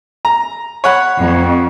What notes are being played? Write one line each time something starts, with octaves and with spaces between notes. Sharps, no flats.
A#5
C#5 F#5 B5
F2